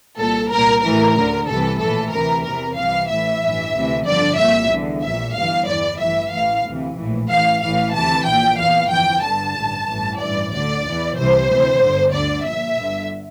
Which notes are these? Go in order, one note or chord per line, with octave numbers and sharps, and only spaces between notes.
C2 A#2 A4
C2 A#2 A#4
A1 A2 E3 A#4
D2 D3
C2 C3 E3 A4
A#1 A2 E3 A4
D2 C3 E3 A#4
E2 C3 E3 A#4
C2 C3 E3 F5
A1 A2 E3 E5
A1 G2 E3
D2 C3 E3
G1 F2 D3 D5
C2 A#2 E5
E2 D3
A#1 A#2 E5
G1 G2 E3 F5
E2 E3 D5
A1 G2 E3 E5
A1 A2 E3 F5
D2 C3 E3
A#1 A2 E3
A1 A2 E3 F5
A1 A2 E3 F5
D2 C3 E3 A5
A#1 A#2 G5
E2 E3 F5
G1 F2 E3 G5
G1 G2 D3 A5
A1 G2 D3
A1 G2 E3
A1 G2 E3 D5
D2 D3 D5
E2 E3
C2 C3 E3 C5
D2 C3 E3
G1 G2 D3
D2 D3 D5
A#1 A#2 E5
G1 G2 D3